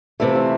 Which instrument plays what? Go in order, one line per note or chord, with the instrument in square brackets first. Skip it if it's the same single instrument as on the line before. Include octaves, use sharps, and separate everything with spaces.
[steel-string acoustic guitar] C3 E3 A3 [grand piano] E4
[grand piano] F4
C4 E4